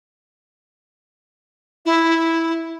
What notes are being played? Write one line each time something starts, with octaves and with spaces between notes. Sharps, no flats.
E4